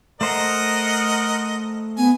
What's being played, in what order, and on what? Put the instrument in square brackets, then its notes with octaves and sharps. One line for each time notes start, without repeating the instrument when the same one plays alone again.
[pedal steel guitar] A3 C5 A#5 [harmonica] A#4 D#5 F#5
[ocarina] B3 [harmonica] G#5